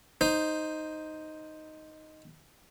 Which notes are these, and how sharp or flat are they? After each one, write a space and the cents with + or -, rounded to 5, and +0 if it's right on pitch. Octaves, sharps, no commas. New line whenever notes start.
D#4 +0 C5 +0